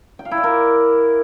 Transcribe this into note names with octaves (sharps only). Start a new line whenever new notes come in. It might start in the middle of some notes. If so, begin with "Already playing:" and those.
G5
F5
E4
D5
A#4